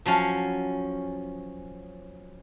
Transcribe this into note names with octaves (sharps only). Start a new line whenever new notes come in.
F3 F#3 C#4 F5